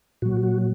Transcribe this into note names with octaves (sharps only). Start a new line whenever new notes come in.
A#2 F#3 F#4
F#4